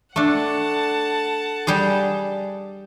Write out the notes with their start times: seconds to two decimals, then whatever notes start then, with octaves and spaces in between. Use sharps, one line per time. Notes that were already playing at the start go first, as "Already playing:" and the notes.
0.16 A3 D4 F#5 A5
1.67 G3 G4 G#4